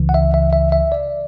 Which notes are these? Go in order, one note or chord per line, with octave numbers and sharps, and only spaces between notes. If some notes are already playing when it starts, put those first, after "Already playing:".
Already playing: C#2 C#3 E3
F#5
E5
E5
E5
E5
D5